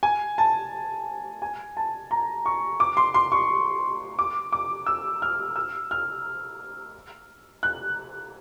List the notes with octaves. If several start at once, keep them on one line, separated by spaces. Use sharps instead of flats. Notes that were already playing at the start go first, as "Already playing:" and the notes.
G#5
A5
G#5
A5
A#5
C#6
D6
C6
C6
C#6
D6
D6
E6
F6
E6
F6
F#6